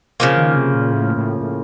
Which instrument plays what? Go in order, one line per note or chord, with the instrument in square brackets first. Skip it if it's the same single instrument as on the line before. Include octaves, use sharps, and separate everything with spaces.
[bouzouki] C#3 F3 A#3
[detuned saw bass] D#3
C3
A#2
A2
A2
A2